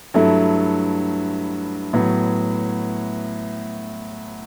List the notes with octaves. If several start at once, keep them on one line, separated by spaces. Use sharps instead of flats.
G2 F#3 A3 E4 A4
A2 F#3 B3